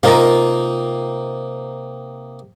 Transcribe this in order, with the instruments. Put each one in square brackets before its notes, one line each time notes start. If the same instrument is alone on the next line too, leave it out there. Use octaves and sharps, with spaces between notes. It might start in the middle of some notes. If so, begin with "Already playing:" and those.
[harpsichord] C3 A#3 D#4 [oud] F4 A#4